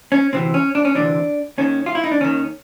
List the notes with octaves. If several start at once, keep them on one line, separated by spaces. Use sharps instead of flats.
C#4
D2 C3 E3 C4
C#4
D4
C#4
D2 C3 E3 D4
D#2 D#3 C#4
F4
E4
D#4
D4
D#2 D#3 C#4